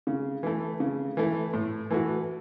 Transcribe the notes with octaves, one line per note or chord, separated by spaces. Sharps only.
C#3
E3 A3
C#3
E3 A3
A2
E3 A3 F#4